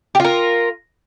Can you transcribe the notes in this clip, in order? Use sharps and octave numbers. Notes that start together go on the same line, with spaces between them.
F4 G4 A#4